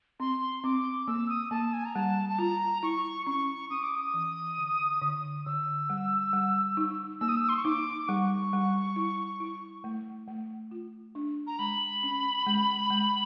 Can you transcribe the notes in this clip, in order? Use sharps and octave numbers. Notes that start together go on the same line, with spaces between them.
C4 C6
C4 D6
A#3 E6
D#6
A#3 A5
G#5
A#5
G3 A5
A5
F4 A#5
E4 C#6
C#4 C#6
C#4 D#6
D6
D#6
E3
D3
D3
D3 E6
G3
G3
D#4
A#3 E6
D#6
E6
C6
C#6
D#4 D6
D6
G3 C#6
G3
E4
E4
A3
A3
F4
D4
A#5
G#3 B5
C#4
G#3
G#3